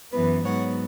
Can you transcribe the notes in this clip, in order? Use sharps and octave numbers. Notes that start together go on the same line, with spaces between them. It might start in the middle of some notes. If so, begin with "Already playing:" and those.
F#2 E3 B3 B4
G#2 F#3 B3 C#5 F#5